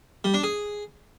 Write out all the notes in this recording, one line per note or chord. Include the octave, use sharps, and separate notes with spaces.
G3
D4
G#4